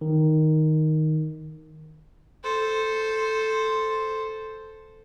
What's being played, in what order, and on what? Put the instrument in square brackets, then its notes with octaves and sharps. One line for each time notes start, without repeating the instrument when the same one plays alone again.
[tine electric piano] D#3
[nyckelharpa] A4 C5